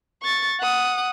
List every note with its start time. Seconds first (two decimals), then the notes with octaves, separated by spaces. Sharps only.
0.23 C#6 A6
0.60 F#5 D#6